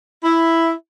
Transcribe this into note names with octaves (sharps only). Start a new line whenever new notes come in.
E4